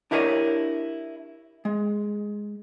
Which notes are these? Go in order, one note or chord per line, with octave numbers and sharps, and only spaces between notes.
D4 E4 G4 A#4 C#5 D#5
G#3